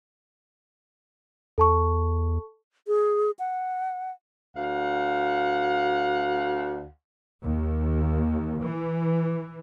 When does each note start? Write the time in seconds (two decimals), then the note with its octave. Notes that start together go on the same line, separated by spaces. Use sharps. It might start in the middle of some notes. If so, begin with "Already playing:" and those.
1.58 E2 A4 A5 C#6
2.88 G#4
3.39 F#5
4.54 D2 F5 F#5
7.43 D#2
8.62 E3